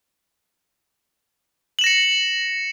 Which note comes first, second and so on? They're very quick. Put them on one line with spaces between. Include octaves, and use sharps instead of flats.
F#7 E7 A#6 C#7